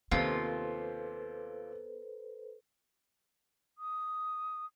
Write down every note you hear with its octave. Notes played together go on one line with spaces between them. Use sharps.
D#2 C3 B3 F4 A4 B4 C5
D#6